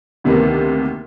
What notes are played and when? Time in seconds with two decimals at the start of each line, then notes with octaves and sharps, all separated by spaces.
0.24 D2 C3 D#3 A#3 B3